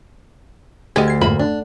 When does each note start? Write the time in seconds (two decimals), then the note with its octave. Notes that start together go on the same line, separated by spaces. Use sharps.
0.96 D2 G4 G#4 D#5
1.08 G#6 C7
1.21 F2 G#2 A#3 B5
1.39 D4